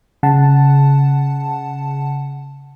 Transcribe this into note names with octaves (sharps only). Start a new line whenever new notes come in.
C#3 F#5 A5